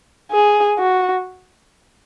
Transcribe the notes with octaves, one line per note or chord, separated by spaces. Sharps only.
G#4
F#4